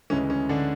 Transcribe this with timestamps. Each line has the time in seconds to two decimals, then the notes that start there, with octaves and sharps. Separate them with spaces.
0.10 D2 C#3 E3 G#3 C#4
0.30 C#4
0.49 D3 D4